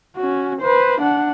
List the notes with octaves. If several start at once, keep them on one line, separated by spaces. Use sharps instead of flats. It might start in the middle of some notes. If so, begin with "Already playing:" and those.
C#4 F#4
B4 C5
D4 F#5